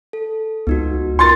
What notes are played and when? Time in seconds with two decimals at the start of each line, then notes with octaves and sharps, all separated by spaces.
0.13 A4
0.67 C#2 B3 D#4 F#4
1.19 B3 F4 A#4 C6 A6